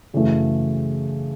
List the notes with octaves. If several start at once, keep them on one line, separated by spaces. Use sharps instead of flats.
F#2 C#3 E3 A3